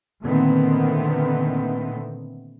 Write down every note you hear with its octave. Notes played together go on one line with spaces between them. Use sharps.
A#2 D3 D#3 A3 B3 C4